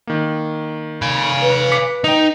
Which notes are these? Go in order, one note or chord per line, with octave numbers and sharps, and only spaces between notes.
D#3 A#3
F5 G#5 B5
B4
D6 B6 C#7
D#4 D#5 G5